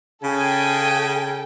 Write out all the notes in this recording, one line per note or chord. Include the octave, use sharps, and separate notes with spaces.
C#3 A4 G5 G#5